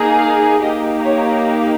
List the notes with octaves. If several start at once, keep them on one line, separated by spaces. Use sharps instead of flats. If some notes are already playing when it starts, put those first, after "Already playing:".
Already playing: A#3 D#4 G#4
F5
A#3 D#4 G4 D#5
C#5